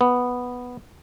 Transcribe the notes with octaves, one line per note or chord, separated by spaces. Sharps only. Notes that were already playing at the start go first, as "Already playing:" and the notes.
B3